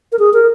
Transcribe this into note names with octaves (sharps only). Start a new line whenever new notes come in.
A#4
G#4
A#4